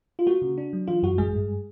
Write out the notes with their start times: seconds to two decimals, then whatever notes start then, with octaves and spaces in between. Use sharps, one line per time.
0.19 F4
0.27 A#3 F#4
0.42 C#3
0.58 D4
0.73 F#3
0.87 E3 F4
1.03 F#2 F#4
1.18 A1 G#3 G#4
1.34 G2